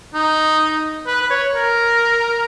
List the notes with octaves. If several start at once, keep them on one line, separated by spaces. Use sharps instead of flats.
D#4
B4
B4
C#5
A#4